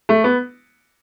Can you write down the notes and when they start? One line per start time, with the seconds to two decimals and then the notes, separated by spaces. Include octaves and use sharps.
0.09 A3
0.24 B3